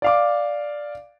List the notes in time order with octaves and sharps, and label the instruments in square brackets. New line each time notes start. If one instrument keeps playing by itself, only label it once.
[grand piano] D5 F5 D6